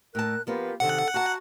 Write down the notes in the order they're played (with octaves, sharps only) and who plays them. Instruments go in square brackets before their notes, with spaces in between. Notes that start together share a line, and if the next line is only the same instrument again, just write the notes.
[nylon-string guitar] A2 A5 [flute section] A#4 F#6
[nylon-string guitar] F3 B3 [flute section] F4 G4 A#4
[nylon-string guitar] C3 D#3 [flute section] A4 [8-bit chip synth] F#5
[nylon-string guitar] F#4 A5 [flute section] A#5 F#6